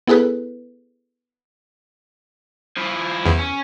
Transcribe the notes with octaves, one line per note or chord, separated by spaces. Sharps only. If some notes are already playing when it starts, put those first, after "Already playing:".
B3 E4 G#4 A4 B4
F3 E4
E2
C#4